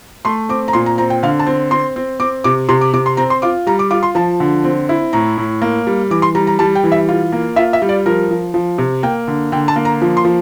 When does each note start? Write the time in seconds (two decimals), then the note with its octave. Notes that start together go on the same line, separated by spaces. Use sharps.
0.25 A3 C6
0.49 C4 D6
0.68 A#5
0.73 A#2 C6
0.86 A#5
0.98 C4 A#5
1.10 G5
1.23 D3 F5
1.39 A5
1.47 C4
1.71 C4 C6
1.96 C4
2.20 C4 D6
2.44 C3 D6
2.69 C3 C6
2.81 D6
2.93 C3 D6
3.06 C6
3.17 C4 A#5
3.30 C6
3.42 F4 D6
3.67 G3 A#5
3.79 D6
3.91 F4 D6
4.03 C6
4.15 F3 A5
4.40 D3
4.64 C4
4.89 E4
5.13 A2 A#5
5.38 A2
5.62 A#3
5.87 G3
6.10 E3 D6
6.22 C6
6.35 G3 A#5
6.47 A#5
6.59 G3 A5
6.75 G5
6.84 E3
6.92 E5
7.09 F4
7.32 A#3
7.56 F4 E5
7.73 E5
7.82 G3
7.89 D5
8.06 F3 A#4
8.31 F3
8.54 F3
8.78 C3
9.03 A#3 G5
9.28 D3
9.52 D3 G5
9.68 A5
9.76 A#3
9.85 A#5
10.02 F3
10.17 C6
10.25 F3